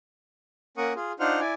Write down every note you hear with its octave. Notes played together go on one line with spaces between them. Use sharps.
A#3 C#4 A#4 F#5 C#6 D#6
F4 G#4
D4 D#4 F4 C5 F#5 F6
E4 D5 G#5